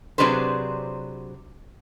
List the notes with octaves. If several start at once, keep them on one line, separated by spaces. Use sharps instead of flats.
C3 F#3 D4 G#4 B4 C5